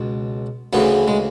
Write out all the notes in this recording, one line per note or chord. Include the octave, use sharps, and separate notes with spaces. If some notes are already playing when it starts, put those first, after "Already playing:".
Already playing: C#2 B2
D2 C#3 E3 B3
G#3